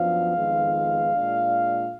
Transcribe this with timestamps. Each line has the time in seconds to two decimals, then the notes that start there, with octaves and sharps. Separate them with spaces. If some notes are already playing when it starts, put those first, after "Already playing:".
Already playing: F#2 F3 B3 D4 F5
0.36 F2 D#3 G#3 B3
1.14 A#2 G#3 D4